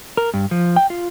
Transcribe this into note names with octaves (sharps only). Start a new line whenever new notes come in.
A#4
G2
F3
G5
F4